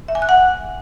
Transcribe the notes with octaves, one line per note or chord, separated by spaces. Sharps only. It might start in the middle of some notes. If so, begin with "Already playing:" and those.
E5
G#5
F#6
F#5